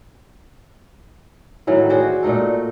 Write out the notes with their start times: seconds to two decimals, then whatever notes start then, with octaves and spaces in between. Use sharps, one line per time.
1.67 A2 D#3 E3 F#3
1.89 F#4 G#4 C5 D5
2.23 A#2 A3 D#4 A4